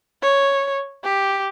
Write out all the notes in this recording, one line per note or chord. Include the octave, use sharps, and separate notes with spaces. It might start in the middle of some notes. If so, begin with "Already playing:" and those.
C#5
G4